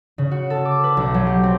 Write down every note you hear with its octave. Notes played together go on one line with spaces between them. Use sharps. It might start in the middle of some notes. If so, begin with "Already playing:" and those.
C#3
F#4
A4
D6
B4
B1
F#3
G4
C4